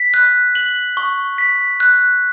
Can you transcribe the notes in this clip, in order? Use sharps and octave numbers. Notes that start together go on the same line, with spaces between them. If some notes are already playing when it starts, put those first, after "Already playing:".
Already playing: B6
F#6
F#7
C#6
B6
F#6